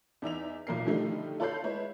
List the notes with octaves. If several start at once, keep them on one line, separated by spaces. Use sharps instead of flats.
E2 D#4 E5 F7
B1 A#2 A#4 C7
D3 D#3 F3 G3 A3 D#4
F4 A4 C#5 B5 G6 C7
G#3 E4 B4 C#5